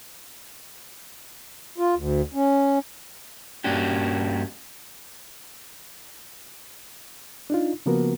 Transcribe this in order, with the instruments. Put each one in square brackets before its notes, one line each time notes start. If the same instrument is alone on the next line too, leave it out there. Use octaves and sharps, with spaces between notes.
[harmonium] F4
D2
C#4
[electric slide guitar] G2 A#3 C#4 D4 F#4 G4
[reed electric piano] D4 D#4 F4
C#3 F3 A#3 B3 F#4 A#4